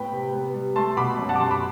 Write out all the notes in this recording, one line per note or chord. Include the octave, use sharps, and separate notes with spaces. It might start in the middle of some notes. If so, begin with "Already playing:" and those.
Already playing: A2 B3 G5 B5
C3
B3
G3
A3 A5 C6
C6
B2 B5 D6
F#2
F#5 A5
D6
F#2 A5 C6
B5 D6